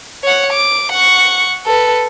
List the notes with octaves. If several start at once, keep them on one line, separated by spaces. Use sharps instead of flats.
C#5 F#5
D6
F#5 C#6
A4 B4